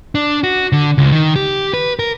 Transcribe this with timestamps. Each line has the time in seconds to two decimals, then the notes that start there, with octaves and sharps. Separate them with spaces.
0.15 D4
0.44 F#4
0.72 D3
0.98 C#2
1.12 D#3
1.36 G4
1.74 B4
1.99 A#4